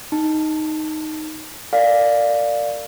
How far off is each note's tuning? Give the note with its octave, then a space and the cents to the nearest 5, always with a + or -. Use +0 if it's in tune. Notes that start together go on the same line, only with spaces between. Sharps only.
D#4 +0 A5 +0
A#4 -25 D5 +0 F5 +5